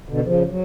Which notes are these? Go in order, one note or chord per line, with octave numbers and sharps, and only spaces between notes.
B2 D3
C#3 F3
F#3